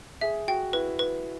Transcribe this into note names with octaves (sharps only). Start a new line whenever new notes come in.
G#4 E5
F#4 G5
E4 B4
B4